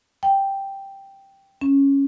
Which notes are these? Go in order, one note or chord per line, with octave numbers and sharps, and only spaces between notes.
G5
C#4